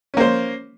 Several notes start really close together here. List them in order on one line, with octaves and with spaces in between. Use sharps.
C#4 A#3 C5